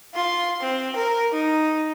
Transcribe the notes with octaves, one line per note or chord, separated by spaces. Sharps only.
F4 C6
C4
A#4
D#4